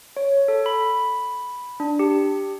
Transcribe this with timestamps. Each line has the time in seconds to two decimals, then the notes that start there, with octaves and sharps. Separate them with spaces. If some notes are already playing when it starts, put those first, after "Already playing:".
0.17 C#5
0.48 A4
0.66 B5
1.80 D4
1.99 G4